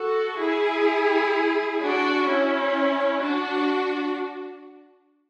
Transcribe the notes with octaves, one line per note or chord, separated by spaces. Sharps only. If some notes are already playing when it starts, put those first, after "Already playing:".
Already playing: F#4 A4
E4 G#4
D4 F#4
C#4 E4
D4 F#4